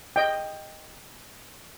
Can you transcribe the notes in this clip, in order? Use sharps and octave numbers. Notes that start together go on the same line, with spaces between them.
D#5 G5